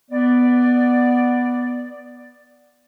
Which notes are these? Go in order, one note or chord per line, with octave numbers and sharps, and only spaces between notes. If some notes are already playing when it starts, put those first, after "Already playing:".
B3 D5